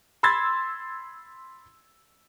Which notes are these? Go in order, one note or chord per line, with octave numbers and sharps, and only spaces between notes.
B5 C6 E6 G#6 A6